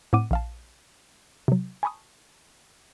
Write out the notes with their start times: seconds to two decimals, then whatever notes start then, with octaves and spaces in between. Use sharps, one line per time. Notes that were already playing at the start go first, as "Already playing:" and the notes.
0.13 A2 C4 F#5 D6 D#7
0.31 A#1 F5 A5
1.48 C3 F#3
1.83 G#5 A5 B5 C#6 D#6